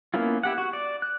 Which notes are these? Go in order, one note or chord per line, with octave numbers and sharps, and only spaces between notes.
A#3 B3 C#4 E4 F4
E4 G4 F#5
F#4
D5
F#6